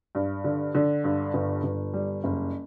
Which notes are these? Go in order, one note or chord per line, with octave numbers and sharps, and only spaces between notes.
G2
D3
D3
G2
G1
G1
G3
F#1